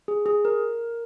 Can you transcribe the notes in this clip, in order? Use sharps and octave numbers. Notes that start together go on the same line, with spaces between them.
G#4
G#4
A#4